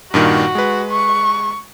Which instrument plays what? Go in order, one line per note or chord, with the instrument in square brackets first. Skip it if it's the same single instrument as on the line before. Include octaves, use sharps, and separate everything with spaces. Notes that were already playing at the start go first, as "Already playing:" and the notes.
[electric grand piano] G2 A#2 D#3 [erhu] F#4
[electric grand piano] G#3 B4
[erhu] C#6